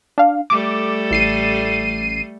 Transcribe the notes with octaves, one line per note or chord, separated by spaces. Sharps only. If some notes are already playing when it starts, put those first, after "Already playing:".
D4 F5
G3 A3 A4 D6
A1 C7 D#7